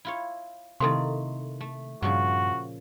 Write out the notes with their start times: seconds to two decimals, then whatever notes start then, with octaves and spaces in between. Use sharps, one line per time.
0.05 E4 F4 C#5
0.80 C3 D#3 A3 A#3 E4 A4 C6
1.61 A3
2.02 G2 A#2 C#3 F3 F#4